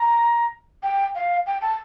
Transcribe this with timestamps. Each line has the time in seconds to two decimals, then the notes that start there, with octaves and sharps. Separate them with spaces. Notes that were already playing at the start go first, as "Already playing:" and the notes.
Already playing: A#5
0.83 G5
1.15 F5
1.47 G5
1.62 A5